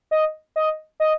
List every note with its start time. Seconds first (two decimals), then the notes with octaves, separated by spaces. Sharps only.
0.11 D#5
0.56 D#5
1.00 D#5